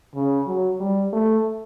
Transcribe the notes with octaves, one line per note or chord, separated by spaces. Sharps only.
C#3
F#3
G3
A3